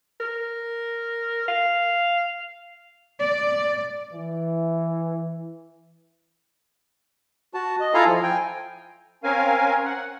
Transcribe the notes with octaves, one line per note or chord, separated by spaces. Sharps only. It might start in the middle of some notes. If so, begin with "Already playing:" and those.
A#4
F5
D5
E3
F#4 A5
D#5
E4 F4 A4 F5 G#5 A#5
F3
G5 G#5
C4 C#4 A#4 F5 G#5
F#5